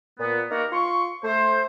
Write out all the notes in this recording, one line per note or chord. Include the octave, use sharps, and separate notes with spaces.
A#2 B3
A#3 D#4 F#4 G4 A#4
F4 C6 C#6
A3 C5